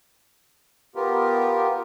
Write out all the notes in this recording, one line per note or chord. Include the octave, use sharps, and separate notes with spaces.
B3 F4 G4 A#4